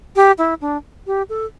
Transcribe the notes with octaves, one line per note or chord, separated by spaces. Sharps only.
G4
E4
D4
G4
A4